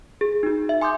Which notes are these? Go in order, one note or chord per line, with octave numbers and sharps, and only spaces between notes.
G#4
D#4 F#4
E5
G#5 C6 D6 D#6 G6